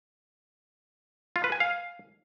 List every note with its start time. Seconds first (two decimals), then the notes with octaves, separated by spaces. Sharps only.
1.36 F4
1.44 B4
1.52 G#5
1.60 F5